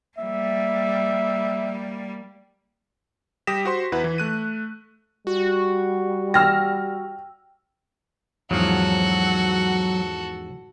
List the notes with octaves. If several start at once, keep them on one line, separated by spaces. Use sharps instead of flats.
G3 A#3 E5
G3 G4 D#6 A#6 B6 E7
F#4 C5 C6
E2 E4 B4 F#5
E3
A3 F#6 D#7
G3 F#4
G5 E6 F6 A#6
E2 G#2 F3 F#3 F#4 A4